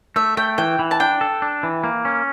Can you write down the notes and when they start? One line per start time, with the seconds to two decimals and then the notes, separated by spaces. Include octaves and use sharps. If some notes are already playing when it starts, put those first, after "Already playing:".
0.16 A3 E5
0.37 A3 G5
0.58 E3 G5
0.79 E3
0.91 A5
1.00 D4 G5
1.21 A4
1.42 D4
1.63 E3
1.84 A#3
2.05 C#4